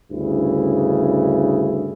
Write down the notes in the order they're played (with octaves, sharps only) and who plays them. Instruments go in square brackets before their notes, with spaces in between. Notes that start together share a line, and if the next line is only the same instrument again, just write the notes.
[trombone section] D2 G2 C#3 E4